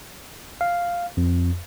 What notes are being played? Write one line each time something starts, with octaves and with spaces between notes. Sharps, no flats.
F5
F2